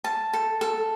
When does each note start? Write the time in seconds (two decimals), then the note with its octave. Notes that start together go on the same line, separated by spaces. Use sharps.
0.04 A5
0.33 A4
0.61 A4